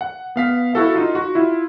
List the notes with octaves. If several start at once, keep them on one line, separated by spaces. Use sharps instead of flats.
F#5
B3 F5 B6
E4 F#4 A4 F5
D#4 F4
F#4
E4 F4